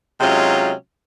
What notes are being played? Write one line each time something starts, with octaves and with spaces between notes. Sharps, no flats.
C3 F#3 G#3 C#4 D#4 F4